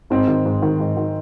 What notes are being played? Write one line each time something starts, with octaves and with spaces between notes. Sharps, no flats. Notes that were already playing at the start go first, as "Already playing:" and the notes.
G#2 C4 D#4
D#3
G#2
D#3
G#2
D#3